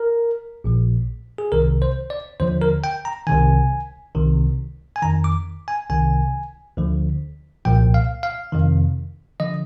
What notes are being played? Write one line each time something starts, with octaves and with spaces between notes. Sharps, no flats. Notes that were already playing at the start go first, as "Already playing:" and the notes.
Already playing: A#4
A#1 A#2 F3
G#4
C2 C3 D#3 A#4
C5
D5
D#2 D3 F3 C5
A#4
G5
A#5
C2 C3 D#3 G#5
C2 C3 D#3
G#5
F2 D#3 A#5
D6
G#5
C2 C3 D#3 G#5
D2 D3 F3
C2 A#2 F3 G5
F5
F5
F2 C3 D#3
D3 F3 D#5